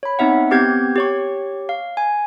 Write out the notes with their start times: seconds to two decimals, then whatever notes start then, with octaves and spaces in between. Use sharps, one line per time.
0.03 C#5 B5
0.19 B3 C4 D#4 E5 F#5
0.51 B3 C4 G4 G6 G#6
0.96 G4 C#5 C#6
1.69 F5
1.97 G#5